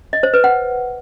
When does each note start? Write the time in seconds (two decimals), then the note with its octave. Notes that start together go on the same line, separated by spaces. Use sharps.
0.13 D#5
0.23 C5
0.34 B4
0.44 F#5